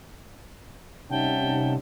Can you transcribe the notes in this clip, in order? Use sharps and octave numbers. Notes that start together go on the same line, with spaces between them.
C3 G3 C#4 D#4 E5 F#5 G5 A5